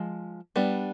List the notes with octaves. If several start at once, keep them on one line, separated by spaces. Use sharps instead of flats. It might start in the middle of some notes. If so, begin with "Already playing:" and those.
Already playing: F3 G#3
G3 B3 D4